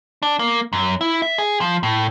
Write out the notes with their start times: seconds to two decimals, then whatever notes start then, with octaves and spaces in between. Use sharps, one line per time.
0.23 D4
0.39 A#3
0.73 F#2
1.01 E4
1.22 E5
1.38 G#4
1.61 F3
1.83 A2